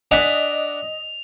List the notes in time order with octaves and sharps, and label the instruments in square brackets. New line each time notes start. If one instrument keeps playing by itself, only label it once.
[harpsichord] D4 F#5 G#5 [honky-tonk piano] D#5 B6 [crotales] F7